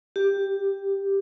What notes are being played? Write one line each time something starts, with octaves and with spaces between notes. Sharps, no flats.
G4